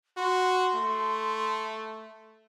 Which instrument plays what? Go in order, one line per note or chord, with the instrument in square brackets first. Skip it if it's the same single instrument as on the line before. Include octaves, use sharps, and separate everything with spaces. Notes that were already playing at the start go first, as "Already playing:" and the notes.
[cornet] F#4 [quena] C6
[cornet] A3